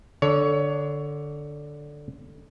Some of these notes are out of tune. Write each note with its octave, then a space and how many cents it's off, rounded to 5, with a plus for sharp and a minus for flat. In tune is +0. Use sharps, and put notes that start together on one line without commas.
D3 +0 C#5 +20